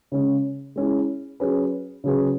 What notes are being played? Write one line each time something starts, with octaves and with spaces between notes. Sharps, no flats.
C#3 G#3 C#4
G#3 C#4 E4
F#3 C#4 G#4 B4
C#3 F#3 C#4 G#4 B4